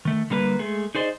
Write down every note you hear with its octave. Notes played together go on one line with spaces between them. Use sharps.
D#3 A3
D3 G3 A#3 A#4 B4
G#3 A3 G#4
D#4 G#4 C5 D5 D#5